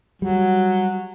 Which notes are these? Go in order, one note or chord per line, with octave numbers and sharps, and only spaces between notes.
F#3 G3